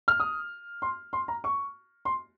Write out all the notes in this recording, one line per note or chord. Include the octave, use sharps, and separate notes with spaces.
F6
D#6
C6
C6
A#5
C#6
C6